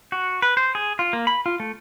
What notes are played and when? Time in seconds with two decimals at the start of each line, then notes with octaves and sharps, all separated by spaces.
0.12 F#4
0.42 B4
0.57 C5
0.75 G#4
0.99 F4
1.13 A#3
1.27 B5
1.46 F4
1.60 A3